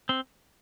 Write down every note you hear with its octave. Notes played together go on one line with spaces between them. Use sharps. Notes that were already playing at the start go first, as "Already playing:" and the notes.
C4